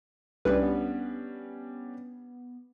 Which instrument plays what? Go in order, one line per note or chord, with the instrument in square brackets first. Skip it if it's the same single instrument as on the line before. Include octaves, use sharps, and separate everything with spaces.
[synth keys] C2 B4 [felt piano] G3 C#4 D4
[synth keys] B3